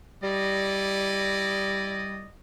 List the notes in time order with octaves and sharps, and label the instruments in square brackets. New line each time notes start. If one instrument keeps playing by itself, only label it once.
[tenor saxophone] G3 [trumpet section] E4 D5 D#5